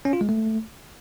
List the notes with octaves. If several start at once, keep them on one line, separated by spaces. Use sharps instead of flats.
C#4
F4
G#3
A3